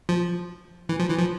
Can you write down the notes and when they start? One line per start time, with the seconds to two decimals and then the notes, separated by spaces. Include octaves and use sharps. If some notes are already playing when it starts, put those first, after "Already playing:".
0.09 F3
0.89 E3
0.99 F3
1.09 E3
1.18 F3